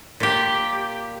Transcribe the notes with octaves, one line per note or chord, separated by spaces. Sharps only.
A#2 G4